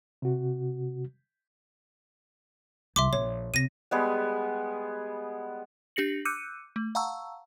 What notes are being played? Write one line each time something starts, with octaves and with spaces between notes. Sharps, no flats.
C3 F#4
C2 E5 C6 D6
A#1 C#5
C3 A#6 D#7
G3 G#3 B3 G#4
D4 G4 A#6 C#7 F#7
D6 E6 F#6 G6 C#7 D#7
A3
F5 F#5 A5 A#5 C#6 E6